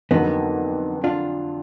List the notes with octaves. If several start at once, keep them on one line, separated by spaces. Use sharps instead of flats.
F2 D3 F#3 A#3 B3 D#4
D4 F4